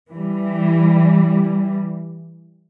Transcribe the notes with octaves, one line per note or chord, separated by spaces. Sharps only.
E3 G3